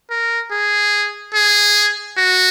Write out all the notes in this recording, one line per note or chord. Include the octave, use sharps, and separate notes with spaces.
A#4
G#4
G#4
F#4